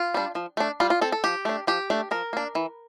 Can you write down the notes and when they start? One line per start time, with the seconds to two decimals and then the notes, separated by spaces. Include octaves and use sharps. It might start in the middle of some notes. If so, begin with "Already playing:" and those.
Already playing: F4
0.14 G3 D4
0.35 F3
0.57 A3 D4
0.80 G3 F4
0.90 F4
1.01 C4 A4
1.12 A4
1.24 F3 G4
1.45 A3 D4
1.67 F3 G4
1.90 A3 D4
2.11 F3 A#4
2.33 A#3 D4
2.55 E3